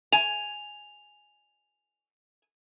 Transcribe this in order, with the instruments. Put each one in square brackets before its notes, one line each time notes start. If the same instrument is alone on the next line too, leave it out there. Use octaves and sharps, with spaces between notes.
[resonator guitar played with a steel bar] G#5 [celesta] F7